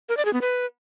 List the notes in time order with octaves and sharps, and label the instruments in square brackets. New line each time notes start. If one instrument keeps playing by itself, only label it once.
[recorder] A#4
D5
G#4
B3
B4